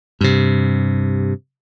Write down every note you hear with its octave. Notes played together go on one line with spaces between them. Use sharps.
G2 C3